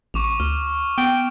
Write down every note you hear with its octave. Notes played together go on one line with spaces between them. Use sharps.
A1 C#6 D6 F7
D2 F6
B3 G5